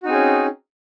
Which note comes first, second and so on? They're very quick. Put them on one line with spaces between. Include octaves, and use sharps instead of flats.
F#4 D#4 C4 G#4 C#4